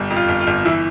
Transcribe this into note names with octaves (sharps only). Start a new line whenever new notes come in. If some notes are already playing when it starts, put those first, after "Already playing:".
Already playing: G1 G3
F2
F4
G1
F4
G1
E3 E4